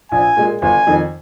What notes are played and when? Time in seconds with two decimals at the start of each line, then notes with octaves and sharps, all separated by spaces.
0.12 A#1 G#5
0.37 A#2 G#3
0.62 G1 G#5
0.87 F2 D#3